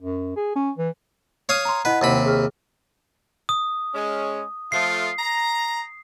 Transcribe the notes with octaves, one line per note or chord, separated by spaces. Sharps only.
F#2
G#4
C#4
E3
C#5 F5 D#6
A#5 C6
E4 B4 D#5 F#5
D#2 C3 B5
G#4 F6
D#6
G#3 C#4
F3 A3 F4 C7
A#5